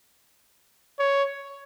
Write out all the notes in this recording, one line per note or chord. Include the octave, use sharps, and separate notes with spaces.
C#5